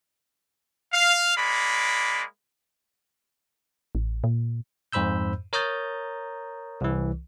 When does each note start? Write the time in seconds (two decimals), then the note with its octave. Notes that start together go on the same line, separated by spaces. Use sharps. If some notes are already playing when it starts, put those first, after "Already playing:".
0.92 F5
1.36 G#3 A#3 D5 B5
3.95 A1
4.24 A#2
4.93 F2 G#2 C5 B5 E6 G6
5.53 A#4 C#5 A#5 D#6 G6 A6
6.81 C2 E3